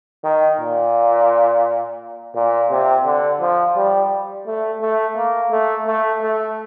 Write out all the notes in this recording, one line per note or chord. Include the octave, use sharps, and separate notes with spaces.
D#3
A#2
A#2
C3
D3
F3
G3
A3
A3
A#3
A3
A3
A3